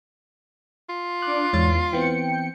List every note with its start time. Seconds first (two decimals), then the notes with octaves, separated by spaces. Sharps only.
0.89 F4
1.22 D4 D6 F#6
1.53 E2 G#2 C#5 A6
1.73 C7
1.93 E3 B3 C4 G5 C#7